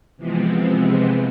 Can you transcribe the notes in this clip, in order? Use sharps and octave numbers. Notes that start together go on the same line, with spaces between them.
C3 E3 F3 G#3 B3 C4